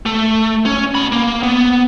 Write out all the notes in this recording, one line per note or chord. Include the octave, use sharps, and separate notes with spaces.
A3
C#4
B2 B5
A#3
B3